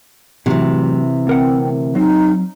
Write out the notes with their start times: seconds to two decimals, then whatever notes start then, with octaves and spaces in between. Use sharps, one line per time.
0.46 E2 A2 C3 E3 F#3
1.27 D2 C4 A#4 F#5
1.95 F#3 C4 D#4